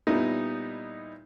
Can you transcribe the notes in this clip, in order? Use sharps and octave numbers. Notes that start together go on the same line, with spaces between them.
A#2 G3 B3 D#4 E4